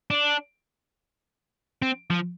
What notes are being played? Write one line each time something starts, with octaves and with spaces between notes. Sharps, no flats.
D4
C4
F3